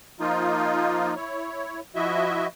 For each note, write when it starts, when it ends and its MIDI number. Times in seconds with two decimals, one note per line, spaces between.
0.20 1.14 53
0.20 1.14 58
0.20 1.14 63
0.20 1.14 65
1.16 1.80 64
1.16 1.80 73
1.95 2.47 53
1.95 2.47 64
1.95 2.47 66
1.95 2.47 75
1.95 2.47 76